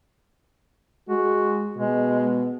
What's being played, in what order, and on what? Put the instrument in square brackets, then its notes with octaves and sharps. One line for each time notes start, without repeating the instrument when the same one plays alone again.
[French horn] G#3 [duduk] F#4
[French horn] B2 [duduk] G#3